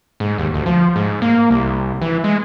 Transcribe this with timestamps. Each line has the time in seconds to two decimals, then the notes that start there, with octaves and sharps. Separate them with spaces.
0.20 G#2
0.38 D#2
0.54 D2
0.66 F3
0.96 G#2
1.22 A#3
1.51 C2
2.02 E3
2.24 G#3